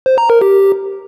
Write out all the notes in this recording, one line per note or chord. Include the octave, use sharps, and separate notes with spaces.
C5
A#5
A#4
G4